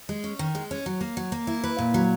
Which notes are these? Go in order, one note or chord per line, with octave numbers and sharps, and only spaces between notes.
G#3
C#4
D#3
G#3
C#4
F#3
A#3
F#3
A#3
E4
B4
A#2
F#3